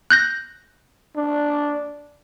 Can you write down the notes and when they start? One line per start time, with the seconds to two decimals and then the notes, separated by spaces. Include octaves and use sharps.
0.10 F#6 G6 A#6
1.17 D4